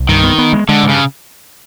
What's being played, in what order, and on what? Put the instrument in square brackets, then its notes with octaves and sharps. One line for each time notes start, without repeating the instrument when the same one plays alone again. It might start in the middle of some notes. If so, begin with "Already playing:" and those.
Already playing: [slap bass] C2
[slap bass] G2 [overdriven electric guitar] D#3
[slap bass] B3
B3
G#3
[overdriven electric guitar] D3 [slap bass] G#3
[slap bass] G2
[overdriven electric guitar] C#3